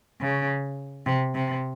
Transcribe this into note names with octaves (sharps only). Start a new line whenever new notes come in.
C#3
C3
C3